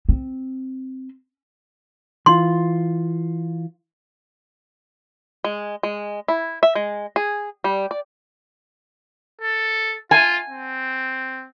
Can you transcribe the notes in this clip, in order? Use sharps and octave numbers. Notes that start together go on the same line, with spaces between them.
C4
E3 F4 C6
G#3
G#3
E4
E5
G#3
G#4
G3
D5
A4
F4 G#5
C4